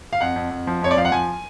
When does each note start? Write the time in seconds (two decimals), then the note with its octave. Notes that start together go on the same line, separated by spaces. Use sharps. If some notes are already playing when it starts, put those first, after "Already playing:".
0.13 F5
0.21 F2 F#5
0.36 F2
0.51 F2
0.67 F3
0.82 F2 C#5
0.91 D5
0.97 F3 F5
1.05 F#5
1.12 F3 G#5